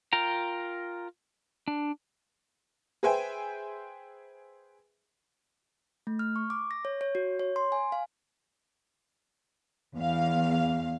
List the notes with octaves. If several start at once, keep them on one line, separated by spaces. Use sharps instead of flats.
F4 A#4 G5 A#5
D4
G#4 B4 C5 E5 G5 G#5
A3
F6
C#6
D6
A#6
C#5
C#5
F#4
C#5
C6
G#5
F5
E2 F5